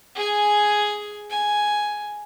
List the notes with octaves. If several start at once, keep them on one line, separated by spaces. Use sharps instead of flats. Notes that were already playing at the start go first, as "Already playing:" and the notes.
G#4 G#5
G#5